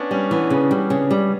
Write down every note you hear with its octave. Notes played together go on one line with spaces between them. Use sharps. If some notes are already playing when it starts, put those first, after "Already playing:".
Already playing: B3 C#4 D4
G3 C#4
E3 B3
C#3
G3
C#3
G3